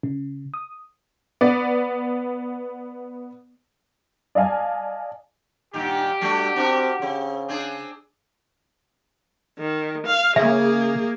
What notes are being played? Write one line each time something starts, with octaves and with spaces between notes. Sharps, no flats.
C#3
D#6
B3 D5
D5 D#5 F5 G#5 A5
G2 A#2 D#3 G4
G3 A3 D4 F#4
C4 D4 F#4 A#4
C#3 C4
C4 D4 G#4
D#3
F5
C#3 A#3 G#4 E5